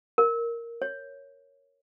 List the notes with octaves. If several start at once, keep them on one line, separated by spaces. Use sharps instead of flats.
A#4
C#5